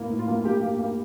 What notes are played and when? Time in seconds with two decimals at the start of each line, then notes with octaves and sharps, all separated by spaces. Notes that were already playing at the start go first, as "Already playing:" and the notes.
Already playing: A2 A#3 E4
0.10 A2
0.19 F4
0.27 A#3
0.45 A#3 G4
0.61 A#3
0.79 A#3